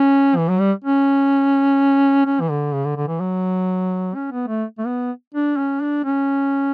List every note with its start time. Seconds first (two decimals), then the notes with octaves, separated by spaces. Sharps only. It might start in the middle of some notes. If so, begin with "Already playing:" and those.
Already playing: C#4
0.37 E3
0.49 F#3
0.60 G3
0.84 C#4
2.26 C#4
2.41 E3
2.50 D3
2.73 C#3
2.85 D3
2.97 D3
3.08 E3
3.20 F#3
4.15 C#4
4.32 B3
4.48 A3
4.78 A3
4.86 B3
5.34 D4
5.57 C#4
5.82 D4
6.04 C#4